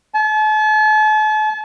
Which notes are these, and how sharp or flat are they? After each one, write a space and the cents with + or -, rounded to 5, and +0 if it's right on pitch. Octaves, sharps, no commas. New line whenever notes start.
A5 -40